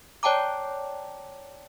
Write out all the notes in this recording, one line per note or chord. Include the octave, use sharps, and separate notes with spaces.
C#5 D5 G5 A5 A#5 D6